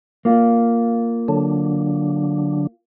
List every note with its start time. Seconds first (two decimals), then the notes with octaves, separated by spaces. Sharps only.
0.25 A#3 F4
1.28 D3 F#3 D4